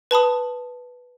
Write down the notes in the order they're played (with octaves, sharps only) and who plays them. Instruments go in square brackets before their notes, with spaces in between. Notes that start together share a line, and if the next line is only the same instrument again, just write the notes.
[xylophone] B4 A5 B5 D#6